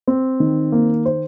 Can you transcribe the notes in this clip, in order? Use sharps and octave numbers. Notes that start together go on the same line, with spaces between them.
C4
D#3
A#3
C5